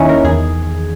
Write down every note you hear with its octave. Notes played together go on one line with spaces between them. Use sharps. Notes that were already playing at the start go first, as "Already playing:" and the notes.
Already playing: D#2 D#3 C#4 D#4 E4
A#4
E2 D#3 G#4